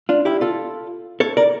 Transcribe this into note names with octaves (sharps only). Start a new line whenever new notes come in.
D4 F4
E4 G4
F4 A4
A4 C#5
A#4 D5